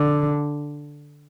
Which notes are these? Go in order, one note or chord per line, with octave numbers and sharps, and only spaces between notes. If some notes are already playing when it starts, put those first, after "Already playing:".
Already playing: D3